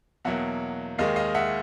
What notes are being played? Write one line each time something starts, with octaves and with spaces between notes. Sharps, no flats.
E2 B2 F#3 A#3 E5 F#5
D#2 D#3 G#3 D#5 F5
D#5 F5
E5 F#5